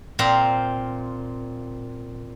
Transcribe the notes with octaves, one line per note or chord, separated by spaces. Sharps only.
A#2 C4 C5 F5 A#5